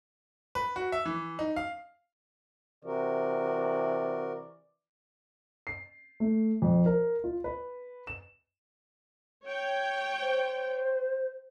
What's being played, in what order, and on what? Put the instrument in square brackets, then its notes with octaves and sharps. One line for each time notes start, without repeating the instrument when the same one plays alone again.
[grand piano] B4
F#4
E5
E3
D#4
F5
[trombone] C3 [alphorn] E3 [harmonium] F#4 A#4 [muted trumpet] D5
[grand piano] C7
A3
F2
A#4
F4
B4
E7
[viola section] C#5 G5
[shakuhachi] C5